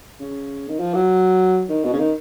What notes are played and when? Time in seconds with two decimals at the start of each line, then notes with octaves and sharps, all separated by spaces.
0.20 C#3
0.69 D#3
0.80 F3
0.94 F#3
1.69 D#3
1.84 B2
1.93 C#3
1.99 D#3